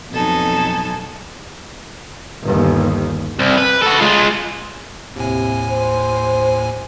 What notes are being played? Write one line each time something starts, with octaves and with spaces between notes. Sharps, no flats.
F2 B2 F#3 D#4 A4 G#5
G1 D#2
C2
B4
F#4 A4
G#3 F4
D#2 A2 C3 G#5
C5